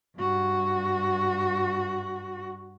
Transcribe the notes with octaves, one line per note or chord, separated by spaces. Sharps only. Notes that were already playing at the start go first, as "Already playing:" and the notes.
G2 F#4